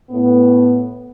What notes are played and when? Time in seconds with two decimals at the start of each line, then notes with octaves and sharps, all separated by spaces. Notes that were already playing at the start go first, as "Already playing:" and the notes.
0.10 A2 B3